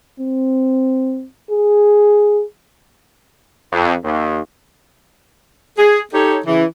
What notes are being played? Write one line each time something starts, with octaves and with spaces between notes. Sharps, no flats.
C4
G#4
F2
D#2
G#4
D#4 G4 A4 C#5
C#3 E3